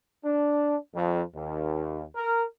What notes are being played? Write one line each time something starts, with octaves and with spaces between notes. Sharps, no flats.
D4
F2
D#2
A#4